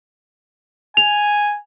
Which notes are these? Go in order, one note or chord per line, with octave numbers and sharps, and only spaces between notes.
G#5 F7